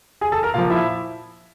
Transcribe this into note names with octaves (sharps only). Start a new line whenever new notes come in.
G#4 G#5
A4 A5
A#4 A#5
A#2 F3 F4 F5
E4 E5